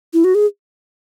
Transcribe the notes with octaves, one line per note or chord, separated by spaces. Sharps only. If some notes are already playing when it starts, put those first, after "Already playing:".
E4
F#4
G#4